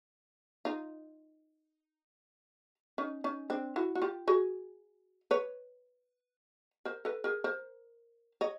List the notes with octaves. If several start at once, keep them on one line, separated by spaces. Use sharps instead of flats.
D#4 F4
C#4 D#4
C#4 D#4
C4 D4
E4 F#4
F#4
F4 G4
F#4 G#4
B4 C#5
A#4 C5
A4 B4
G#4 A#4
A#4 C5
C#5 D#5